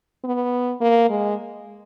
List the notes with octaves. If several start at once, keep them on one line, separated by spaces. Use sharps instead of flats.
B3
A#3
G#3